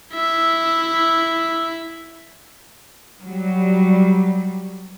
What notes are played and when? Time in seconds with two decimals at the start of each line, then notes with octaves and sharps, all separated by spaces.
0.13 E4 E5
3.23 F#3 G3